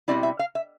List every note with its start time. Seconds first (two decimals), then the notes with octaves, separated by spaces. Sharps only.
0.08 B2 G3 C4 E4 D5
0.23 E5
0.39 F5
0.55 E5